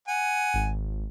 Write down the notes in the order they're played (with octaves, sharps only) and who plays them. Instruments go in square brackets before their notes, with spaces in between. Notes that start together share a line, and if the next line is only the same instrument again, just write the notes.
[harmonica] F#5 G#5
[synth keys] G#1